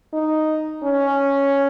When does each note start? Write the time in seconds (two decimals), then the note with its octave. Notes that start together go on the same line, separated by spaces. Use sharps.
0.13 D#4
0.84 C#4